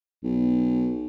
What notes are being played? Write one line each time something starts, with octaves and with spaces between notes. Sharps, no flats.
B1